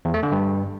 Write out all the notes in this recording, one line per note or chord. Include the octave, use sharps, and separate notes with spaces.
E2
A3
D3
G2